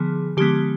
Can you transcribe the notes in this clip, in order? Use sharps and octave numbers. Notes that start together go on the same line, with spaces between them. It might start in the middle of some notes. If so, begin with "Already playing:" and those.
Already playing: D3 F3 B3 G#4
D3 F3 G#3 B3 G4